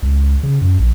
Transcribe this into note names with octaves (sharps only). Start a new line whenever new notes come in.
C#2
C#3
F#2
A#1